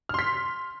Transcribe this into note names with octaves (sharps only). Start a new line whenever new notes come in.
C6 F6 B6